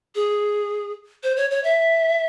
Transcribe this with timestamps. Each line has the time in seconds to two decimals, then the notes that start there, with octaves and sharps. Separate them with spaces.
0.15 G#4
1.23 C5
1.36 C#5
1.51 C#5
1.64 E5